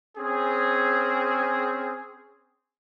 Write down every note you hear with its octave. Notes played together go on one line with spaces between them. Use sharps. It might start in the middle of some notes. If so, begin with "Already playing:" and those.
C4 C#4 G#4